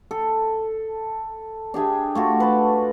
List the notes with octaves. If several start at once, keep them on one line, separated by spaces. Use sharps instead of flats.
A4
D4 G4 G#4 E5
A3 F4 F#4
B4 A5